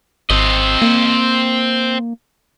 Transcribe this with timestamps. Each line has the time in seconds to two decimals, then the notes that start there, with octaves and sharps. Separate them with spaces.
0.30 G#1 C4 D#5
0.82 A#3